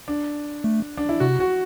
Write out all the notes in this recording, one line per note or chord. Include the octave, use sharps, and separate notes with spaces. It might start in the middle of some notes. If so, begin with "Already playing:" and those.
D4
A3
D4
E4
C3 F#4
F#4